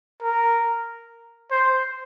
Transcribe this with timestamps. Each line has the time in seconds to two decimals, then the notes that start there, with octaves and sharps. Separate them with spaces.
0.22 A#4
1.51 C5